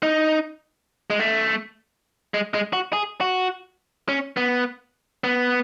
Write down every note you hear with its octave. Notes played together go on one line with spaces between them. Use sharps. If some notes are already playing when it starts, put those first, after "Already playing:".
D#4
G#3
A3
G#3
G#3
F#4
G#4
F#4
C#4
B3
B3